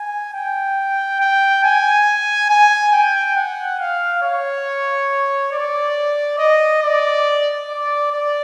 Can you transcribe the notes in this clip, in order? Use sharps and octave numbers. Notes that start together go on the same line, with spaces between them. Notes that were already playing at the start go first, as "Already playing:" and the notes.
Already playing: G#5
G5
G5
G#5
G#5
G5
F#5
F5
C#5
D5
D#5
D5
D5
D5